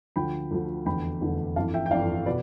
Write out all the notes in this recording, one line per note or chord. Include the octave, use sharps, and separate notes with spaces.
D2 D3 F3 G5 B5
D2 D3 F3
F1 E2 D3 G5 B5
F1 E2 D3
G1 F2 E3 F5 A5
E5 G5
G5
G1 F2 E3 D5 F5
B2 B4 D5